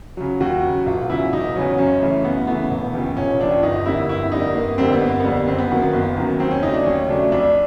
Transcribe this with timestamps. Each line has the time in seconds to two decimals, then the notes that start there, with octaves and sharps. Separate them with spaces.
0.17 C#3 F#3
0.40 D#2 F#4
0.63 C#3 F#3
0.86 E1 F4
1.09 E2 C#3 F#3 E4
1.32 E1 D#4
1.56 E2 C#3 F#3 C#4
1.78 F#2 C#4
2.02 C#3 E3 A3
2.24 F#2 B3
2.47 C#3 E3 A3 B3
2.70 E1
2.94 D#2 C#3 F3
3.17 E1 C#4
3.40 D#2 C#3 F3 D4
3.63 G1 D#4
3.86 F2 D3 G3 A#3 E4
4.09 G1 E4
4.32 F2 D3 G3 A#3 D#4
4.55 G1 A#3
4.78 F2 D3 G3 A#3 C4
4.92 B3
5.01 G1 A#3
5.20 F2 D3 G3 A#3 B3
5.48 F#1 C4
5.58 B3
5.70 F#2 D#3 F#3 A#3 B3
5.82 B3
5.93 F#1
6.17 F#2 D#3 F#3 A#3
6.40 D#2 C4
6.51 C#4
6.63 C#3 F#3 A3 D#4
6.74 D4
6.86 D#2 C#4
7.08 C#3 F#3 A3 D4
7.32 F2 D4